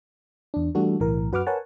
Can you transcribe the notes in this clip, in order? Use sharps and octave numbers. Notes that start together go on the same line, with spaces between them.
E2 D4
E3 G3 A3 D4 F#4 A4
B1 A2 E3 A#4
F#2 F#4 B4 F#5 D6 F6
A#4 B4 C#5 F#5 G#5 A5